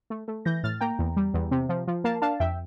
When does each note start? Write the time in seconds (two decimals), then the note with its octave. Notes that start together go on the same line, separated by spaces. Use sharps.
0.10 A3
0.28 A3
0.45 E3 G6 A#6
0.63 A2 F6 A6
0.81 A#3 G5 A#5
0.99 E2
1.17 G3
1.34 E2
1.51 C3
1.69 F3
1.87 F3
2.04 A#3 F5 A5
2.22 D4 F5 A5
2.40 F2 E5 G5